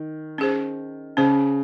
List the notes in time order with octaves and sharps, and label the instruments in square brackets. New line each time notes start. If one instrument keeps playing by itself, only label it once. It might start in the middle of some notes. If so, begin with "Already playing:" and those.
Already playing: [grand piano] D#3
[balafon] C#4 G#4 C5
[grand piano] C#3 [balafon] C#4 G#4 C5